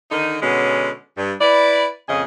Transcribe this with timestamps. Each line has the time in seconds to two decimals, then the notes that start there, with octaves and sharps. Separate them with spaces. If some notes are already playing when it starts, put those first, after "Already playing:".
0.12 D3 D#3 D#4
0.42 B2 D3 G#3 C#4
1.18 G2
1.41 E4 B4 D5
2.09 F2 A#2 C#3 G#4 D#5